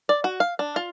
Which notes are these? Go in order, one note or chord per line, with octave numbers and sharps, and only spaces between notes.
D5
F#4
F5
D4
F4